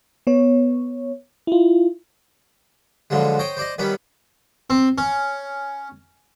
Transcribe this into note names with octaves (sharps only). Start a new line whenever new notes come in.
B3 C#5
E4 F4
B2 D3 F3 F#3 G#3
C5 C#5 D#5 G5
C5 D5 D#5
D#3 G3 B3 C#4 B5
C4
C#4